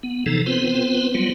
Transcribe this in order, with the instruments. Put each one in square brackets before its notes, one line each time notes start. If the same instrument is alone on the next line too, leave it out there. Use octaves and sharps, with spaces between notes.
[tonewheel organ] B3
C3 E3 F3 D#4 A4
B3 C4 F4 B4 C5
F#3 G3 B3 F4